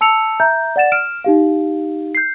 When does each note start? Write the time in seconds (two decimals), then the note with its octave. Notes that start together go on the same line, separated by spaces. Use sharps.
0.01 A5 E6 C#7 F7
0.40 E5 A#5 G6
0.76 D5 F#5 A6 E7
0.92 F6 D7 E7
1.24 D#4 G4 F5
2.15 G6 C7